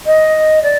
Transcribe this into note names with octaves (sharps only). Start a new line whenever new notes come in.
D#5
D5